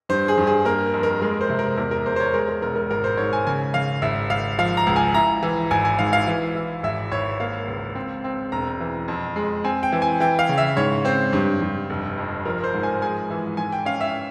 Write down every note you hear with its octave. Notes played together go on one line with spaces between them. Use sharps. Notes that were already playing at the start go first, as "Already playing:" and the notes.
G2 C5
G#4
G2
G#4
A#3 A#4
F2
A#4
G#3 A#4
C5
C3
A#4
E2 A#4
A#4
E2 C5
C5
C#5
G#3 A#4
A#4
E1 A#4
A#4
G#1 A#4
C5
G#2 C#5
G#5
C#3 G#5
C#3 F5
G#1 E5
G#1 F5
F3 F5
A#5
C#2
G#5
E4 A#5
E3
G#1 G#5
G#5
G#2 F5
F5
E3
E3
G#1 E5
G#1 C#5
A#3 F5
C#2
C4
C4
E1 A#5
E3
F2
G#3
C4 G#5
G5
E3
G#5
E3 G5
F5
C#3
E5
G#2 C#5
C4 C5
G2
G2
F1
F2
F3 A#4
C5
G#2
G#5
G#3 G#5
E3
G#2 G#5
G5
C#4 F5
E5